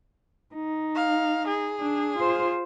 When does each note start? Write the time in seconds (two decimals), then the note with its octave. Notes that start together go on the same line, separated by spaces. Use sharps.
0.55 D#4
0.96 F5
1.47 G#4
1.80 D4
2.18 F4 C5